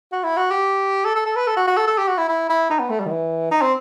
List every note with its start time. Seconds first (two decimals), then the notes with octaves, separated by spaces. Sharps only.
0.12 F#4
0.24 E4
0.37 F#4
0.51 G4
1.05 A4
1.15 A4
1.26 A4
1.36 B4
1.47 A4
1.57 F#4
1.67 F#4
1.77 A4
1.87 A4
1.98 G4
2.08 F#4
2.18 E4
2.29 E4
2.49 E4
2.70 D#4
2.80 B3
2.90 A3
3.00 G3
3.06 D#3
3.11 E3
3.51 D#4
3.62 C4